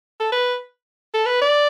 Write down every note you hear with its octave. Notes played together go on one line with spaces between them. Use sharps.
A4
B4
A4
B4
D5